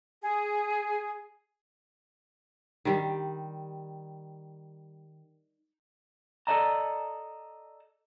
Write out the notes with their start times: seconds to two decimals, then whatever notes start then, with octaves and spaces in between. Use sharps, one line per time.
0.22 G#4
2.85 D#3 G3
6.47 A4 C5 D5 D#5 A5 A#5